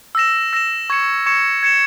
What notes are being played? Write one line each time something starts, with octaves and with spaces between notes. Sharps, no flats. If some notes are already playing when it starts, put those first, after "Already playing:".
E6 A#6 E7
E6 A#6 E7
C#6 G#6 C#7 E7
C#6 G#6 C#7 E7
G#6 C#7 E7